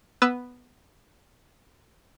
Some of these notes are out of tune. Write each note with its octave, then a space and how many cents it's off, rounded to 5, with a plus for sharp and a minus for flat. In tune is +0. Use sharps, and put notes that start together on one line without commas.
B3 +0 B4 +5 E6 +0